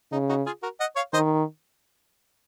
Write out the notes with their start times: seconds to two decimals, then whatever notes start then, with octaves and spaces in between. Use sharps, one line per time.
0.12 C#3 D#4
0.29 D#4 F#4
0.46 F4 G#4
0.63 F#4 A#4
0.80 D#5 F#5
0.96 C#5 F5
1.13 D#3 C5 D#5